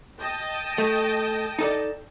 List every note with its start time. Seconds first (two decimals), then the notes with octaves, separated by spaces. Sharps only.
0.20 D#5 G5 A5
0.78 A3
1.59 D#4 A4 D5